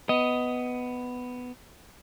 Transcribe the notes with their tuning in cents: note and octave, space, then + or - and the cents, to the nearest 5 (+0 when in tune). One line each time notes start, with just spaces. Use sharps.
B3 +10 D#5 +10